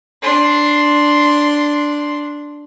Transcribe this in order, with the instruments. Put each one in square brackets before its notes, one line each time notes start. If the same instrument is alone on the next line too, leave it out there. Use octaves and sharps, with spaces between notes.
[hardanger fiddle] D4 C6